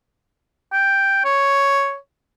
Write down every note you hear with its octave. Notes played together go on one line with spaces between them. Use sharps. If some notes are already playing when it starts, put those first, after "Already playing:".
G5
C#5